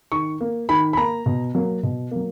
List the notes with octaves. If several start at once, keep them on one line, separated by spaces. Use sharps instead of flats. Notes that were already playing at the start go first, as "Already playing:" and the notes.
D#3 C#6
A#3
D#3 B5
B5
A#3 A#5
B2
F#3 A#3
B2
F#3 A#3